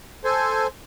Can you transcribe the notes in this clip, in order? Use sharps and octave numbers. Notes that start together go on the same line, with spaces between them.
A4 C5 G#5